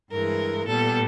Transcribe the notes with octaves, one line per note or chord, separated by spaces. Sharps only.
G2 E3 G#3 A#4
A#2 G3 B3 A4